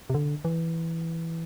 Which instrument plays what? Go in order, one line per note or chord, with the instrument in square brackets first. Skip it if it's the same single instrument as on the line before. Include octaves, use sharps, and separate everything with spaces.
[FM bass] C3
D3
E3